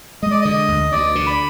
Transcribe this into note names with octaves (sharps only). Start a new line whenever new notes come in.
G#3 D#5
D5
D3 D#5
D2
D2 D5
D3
B5